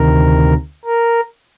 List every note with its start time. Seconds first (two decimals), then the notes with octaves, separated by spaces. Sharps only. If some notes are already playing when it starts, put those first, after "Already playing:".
Already playing: D2 C3 D#3 A#4
0.85 A#4